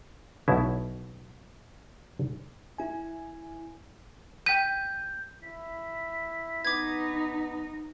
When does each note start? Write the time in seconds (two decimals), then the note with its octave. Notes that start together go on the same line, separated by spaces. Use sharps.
0.48 B1 B2 E4 E5
2.78 E4 G#5
4.46 G5 G6 B6 D#7
5.42 E4 B6
6.65 B3 D#4 D6 G#6